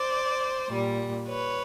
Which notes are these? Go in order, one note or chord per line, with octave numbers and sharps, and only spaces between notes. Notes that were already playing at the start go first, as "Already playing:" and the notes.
Already playing: C5 D5
A#2 G3
B4 C#5